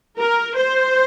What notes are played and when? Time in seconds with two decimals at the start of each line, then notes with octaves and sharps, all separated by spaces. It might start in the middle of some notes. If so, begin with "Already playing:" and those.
0.18 A#4
0.56 C5